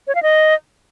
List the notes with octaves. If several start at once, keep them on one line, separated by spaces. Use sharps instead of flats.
C#5
F5
D#5